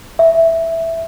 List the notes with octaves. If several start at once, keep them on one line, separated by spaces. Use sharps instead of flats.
E5